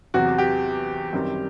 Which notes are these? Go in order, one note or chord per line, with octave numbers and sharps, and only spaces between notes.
E2 C3 F#3 F#4
G4
F#2 D#3 G3 C4